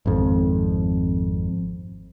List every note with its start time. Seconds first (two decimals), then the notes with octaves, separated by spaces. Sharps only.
0.06 G#1 F2